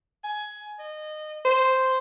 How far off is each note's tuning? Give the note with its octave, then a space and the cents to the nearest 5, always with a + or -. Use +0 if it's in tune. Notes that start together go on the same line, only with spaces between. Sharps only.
G#5 +15
D#5 -25
C5 -5